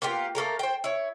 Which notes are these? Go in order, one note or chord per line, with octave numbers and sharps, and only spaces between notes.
A#3 B3 F4 G4
A3 A#3 A4 A#4
C5 G5
E4 C#5